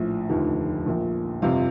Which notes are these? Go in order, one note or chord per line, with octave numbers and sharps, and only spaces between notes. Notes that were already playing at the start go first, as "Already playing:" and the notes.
Already playing: A#1 A2 F3
F1 D#2 D3 F3
A#1 A#2 F3
G1 F2 C3 F3 F5